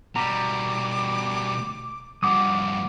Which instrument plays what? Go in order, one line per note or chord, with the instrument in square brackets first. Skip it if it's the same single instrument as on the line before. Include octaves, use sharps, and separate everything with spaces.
[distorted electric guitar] B2 G3 [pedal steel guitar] A#5 B5 [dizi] D6
[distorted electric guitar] G2 F3 [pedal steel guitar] F#5 D6 D#6